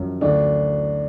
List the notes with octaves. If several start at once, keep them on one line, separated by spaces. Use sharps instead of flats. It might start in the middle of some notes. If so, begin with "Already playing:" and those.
Already playing: F#2 F3
D2 D4